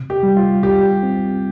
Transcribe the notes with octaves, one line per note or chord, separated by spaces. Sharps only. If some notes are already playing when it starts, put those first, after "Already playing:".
Already playing: C3
G4
G3
F4
C2 G4
C4